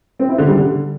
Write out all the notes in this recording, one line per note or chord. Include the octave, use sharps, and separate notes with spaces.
C4
E4
D3
G3
D3